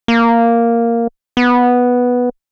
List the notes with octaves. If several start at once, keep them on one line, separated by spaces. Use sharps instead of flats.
A#3
B3